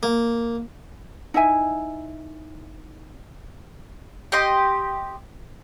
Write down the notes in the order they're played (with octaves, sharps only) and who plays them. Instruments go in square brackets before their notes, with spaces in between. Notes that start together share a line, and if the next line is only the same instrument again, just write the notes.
[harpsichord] A#3
[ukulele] D#4 E4 E5 G#5
[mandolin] G4 D#5 C6